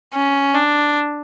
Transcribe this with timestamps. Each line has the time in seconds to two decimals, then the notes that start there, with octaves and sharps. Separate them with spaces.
0.13 C#4
0.54 D4